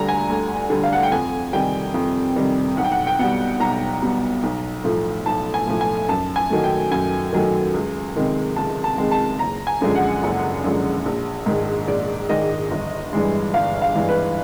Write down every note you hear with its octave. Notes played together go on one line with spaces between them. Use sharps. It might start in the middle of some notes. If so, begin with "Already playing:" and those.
Already playing: D2 D3 G3 A#5
G#5
D2
D3 G3
F5
F#5
G5
F2 G#5
C3 D#3 G3 G5
F2
C3 D#3 G3
B1 F#5
G5
F#5
G5
B2 G3 F#5
B1 A#5
B2 G3
B1
A2 F3 A3
B1 A5
G#5
A2 F3 A3
G#5
F#2 A5
G#5
D#3 F#3 A3
G5
F#2 G#5
D#3 F#3 A3
C#2
C3 D#3 G#3
C#2 A5
A5
C3 D#3 G#3
A5
F#1 A#5
G#5
F#2 D3 F3 G#3
F#5
F#1
F#2 D3 F3 G#3
A#1
G#2 D#3 G#3
A#1 D5
G#2 D#3 G#3 D#5
G1
G2 E3 G#3
G1 F5
F5
G2 E3 G#3
B4